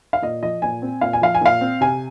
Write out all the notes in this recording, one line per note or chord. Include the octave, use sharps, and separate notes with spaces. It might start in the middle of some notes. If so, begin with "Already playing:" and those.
F5
A#2 D#5
F3 D#5
A#2 G#5
C4
A#2 F5
G#5
F3 F5
G#5
A#2 F5
C4
C3 G#5